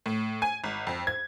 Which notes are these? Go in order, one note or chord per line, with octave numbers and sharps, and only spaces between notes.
A2
G#5
G#1
F2
G#6